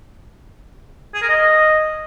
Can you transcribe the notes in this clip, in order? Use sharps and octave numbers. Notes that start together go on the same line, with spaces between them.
G#4
A#4
D#5